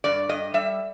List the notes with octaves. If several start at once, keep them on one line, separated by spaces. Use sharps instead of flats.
G2 D5
G2 D#5
G3 E5